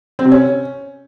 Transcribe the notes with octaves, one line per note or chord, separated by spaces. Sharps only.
C4
C3
C#4